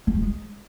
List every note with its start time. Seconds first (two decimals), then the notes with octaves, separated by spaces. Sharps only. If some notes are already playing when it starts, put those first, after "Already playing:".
0.07 G#3
0.15 G3
0.22 G#3